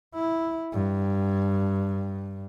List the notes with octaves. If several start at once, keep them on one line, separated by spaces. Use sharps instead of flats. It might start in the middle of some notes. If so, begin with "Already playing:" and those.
E4
G2